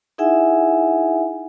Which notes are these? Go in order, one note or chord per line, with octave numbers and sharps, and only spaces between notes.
D#4 E4 G#4 E5 F#5 G#5